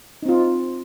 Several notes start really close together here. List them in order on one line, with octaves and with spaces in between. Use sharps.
D#4 C4 F4